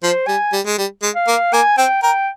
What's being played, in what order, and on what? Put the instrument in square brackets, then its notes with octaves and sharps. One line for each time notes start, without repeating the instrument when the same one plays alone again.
[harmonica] F3 [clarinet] C5
[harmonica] G3 [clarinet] G#5
[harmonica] G3
G#3
G3
G#3
[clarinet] F5
[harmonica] A#3
[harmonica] A#3 [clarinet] G#5
[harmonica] C4 [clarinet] G5
[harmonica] A#4 [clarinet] G5